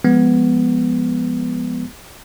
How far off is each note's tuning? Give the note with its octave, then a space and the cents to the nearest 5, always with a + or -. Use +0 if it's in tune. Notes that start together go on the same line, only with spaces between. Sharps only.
F3 +0 G#3 -5 B3 +0